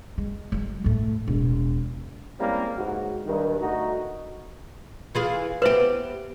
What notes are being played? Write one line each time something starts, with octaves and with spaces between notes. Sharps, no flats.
G#3
F#3 G#3
A2 A3
E1
G3 G#3 A#3 C4 C#4 E4
C#2 G#2 F#4
G2 D#3
D3 A3 D#4 F#4
E3 F4 G#4
B3 G4 B4 C5 E5